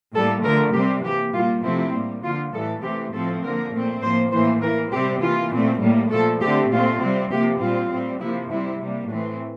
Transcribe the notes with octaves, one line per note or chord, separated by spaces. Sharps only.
A2 G3 A#3 A4
D3 F3 A3 A#4
C3 G3 C4 G4
E3 A#3 G4
A#2 G3 A#3 F4
C3 F3 A3 C4 E4
A2 G3 A#3
D3 F3 A#3 F4
A2 E3 G3 A4
C3 E3 A3 C4 G4
A2 F3 A3 C4 A4
D3 F3 A#3 A#4
A#2 A3 C4
A2 F3 A#3 C5
A2 E3 A#3 C5
E3 A#3 A#4
C3 G3 C4 G4
E3 A#3 F4
A#2 A3 C4
A2 G3 A#3
A#2 F3 A3 A4
D3 A3 C4 G4
A#2 A3 C4 F4
C3 G3 C4
C3 F3 A#3 G4
A#2 G3 C4 F4
A2 G3 C4
C3 F3 A#3 E4
C3 G3 C4 E4
C3 G3 A#3
A2 E3 A3 C4 D4